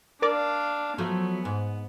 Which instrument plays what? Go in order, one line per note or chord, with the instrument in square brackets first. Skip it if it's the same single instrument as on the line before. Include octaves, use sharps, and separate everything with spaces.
[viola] D4 F5 [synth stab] A#4 D5
[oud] F3 F#3 A3 [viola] B3
[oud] G#2